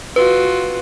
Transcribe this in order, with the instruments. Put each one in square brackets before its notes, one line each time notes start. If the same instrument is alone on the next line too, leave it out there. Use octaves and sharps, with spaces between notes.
[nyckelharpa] F4 F#4 [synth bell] B4